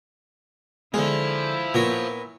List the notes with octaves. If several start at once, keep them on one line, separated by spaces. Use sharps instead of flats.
D3 G#3 E4 F4 G#4 C5
A#2 B3 A#4 C#5